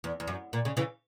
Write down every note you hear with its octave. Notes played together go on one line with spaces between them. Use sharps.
E2
E2
F#2
A#2
C#3
C#3 E3